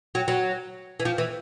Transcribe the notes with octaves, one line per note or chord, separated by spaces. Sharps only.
F#3
F#3
E3
F3
E3